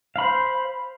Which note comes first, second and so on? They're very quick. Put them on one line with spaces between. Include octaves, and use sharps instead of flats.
F5 B5 C5